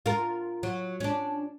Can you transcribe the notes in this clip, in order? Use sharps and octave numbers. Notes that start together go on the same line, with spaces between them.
F4 A#4
F#3
C#4 D4